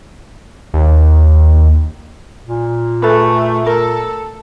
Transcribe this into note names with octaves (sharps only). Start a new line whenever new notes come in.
D#2
A#2
A3 G#4 A4 B4
A4 A#4